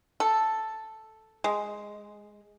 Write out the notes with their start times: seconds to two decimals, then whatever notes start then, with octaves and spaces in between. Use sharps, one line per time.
0.20 A4
1.44 G#3